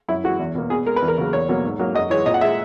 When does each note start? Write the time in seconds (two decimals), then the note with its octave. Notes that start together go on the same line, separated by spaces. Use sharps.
0.08 F#2 E4
0.24 E3 G#3 F#4
0.39 E2
0.55 B2 A#3
0.70 B2 G#4
0.86 G#3 A#4
0.96 B4
1.02 E2
1.08 A#4
1.18 C#3 F#3 A#3
1.33 E2 C#5
1.49 B2 F#3 A#3
1.65 G#2
1.79 F#3 A#3
1.95 F#2 D#5
2.10 E3 G#3 C#5
2.26 A#2 D#5
2.34 F#5
2.41 G#3 E5